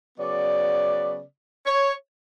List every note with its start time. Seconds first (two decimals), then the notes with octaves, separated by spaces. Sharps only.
0.18 C#3 F#3 B3 D5
1.66 C#5